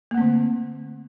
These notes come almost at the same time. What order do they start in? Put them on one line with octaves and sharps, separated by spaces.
A#3 A3 C4 D3